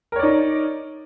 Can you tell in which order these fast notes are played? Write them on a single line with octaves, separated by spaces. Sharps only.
A#4 C#5 D5 D#4